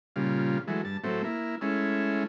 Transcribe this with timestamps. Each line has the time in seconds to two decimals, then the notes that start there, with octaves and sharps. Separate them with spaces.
0.16 A#2 C#3 G3 F4
0.67 E3 F#3 G#3 A3
0.85 G2 A5
1.04 A2 F#3 A3 C4
1.24 A#3 E4
1.61 G#3 A3 C#4 E4